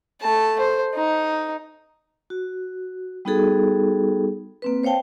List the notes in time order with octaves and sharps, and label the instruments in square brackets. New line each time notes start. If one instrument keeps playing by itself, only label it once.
[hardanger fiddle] A3 A5
C5
D#4
[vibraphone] F#4
G3 B3 D#4 F#4 G#4 A4
A#3 C4 B4
C5 C#5 F5 G5 A5